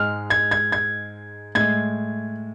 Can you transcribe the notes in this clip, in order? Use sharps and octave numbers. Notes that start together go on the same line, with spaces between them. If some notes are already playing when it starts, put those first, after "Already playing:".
Already playing: G#2 G#3 F6
G#6
G#6
G#6
A2 G#3 G#6